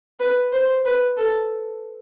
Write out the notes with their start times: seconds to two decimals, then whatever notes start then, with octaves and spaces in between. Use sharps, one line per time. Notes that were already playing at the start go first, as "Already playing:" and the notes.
0.20 B4
0.52 C5
0.85 B4
1.17 A4